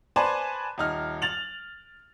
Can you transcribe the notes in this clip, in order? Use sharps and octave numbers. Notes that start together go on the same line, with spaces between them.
B4 C5 D5 G#5 A5 C6
D#1 D#4 F6
A6 F7 F#7